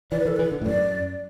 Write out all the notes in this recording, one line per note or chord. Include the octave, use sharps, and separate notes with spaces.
E3 D5
B4
E3 A4
E3 B4
D3
A2
F#2 D5